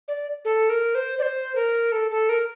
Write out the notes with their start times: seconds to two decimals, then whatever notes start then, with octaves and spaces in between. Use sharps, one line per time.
0.08 D5
0.45 A4
0.69 A#4
0.95 C5
1.19 D5
1.23 C5
1.56 A#4
1.92 A4
2.11 A4
2.29 A#4